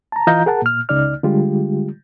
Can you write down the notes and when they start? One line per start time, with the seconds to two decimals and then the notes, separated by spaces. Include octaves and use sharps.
0.12 A5 A#5
0.27 E3 F4 D#5 F5 A#5 G6
0.46 G#4 A#4 F#5 A5
0.62 A#2 F6
0.89 C#2 C#3 D#4 D5 F6
1.23 D3 G3 G#3 F4 G4